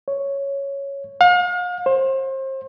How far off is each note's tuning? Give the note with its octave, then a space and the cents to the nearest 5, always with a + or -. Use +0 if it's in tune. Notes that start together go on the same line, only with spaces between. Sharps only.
C#5 +0
F5 +40
C5 +30